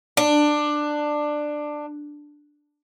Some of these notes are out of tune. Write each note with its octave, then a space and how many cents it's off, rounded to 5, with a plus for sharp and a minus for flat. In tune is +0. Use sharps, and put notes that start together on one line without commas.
D4 +15